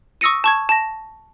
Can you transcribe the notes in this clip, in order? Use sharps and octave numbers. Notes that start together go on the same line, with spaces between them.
C#6 D#6 E6 A#6 C#7 D#7
A5 C#6 G#6
A5 A#6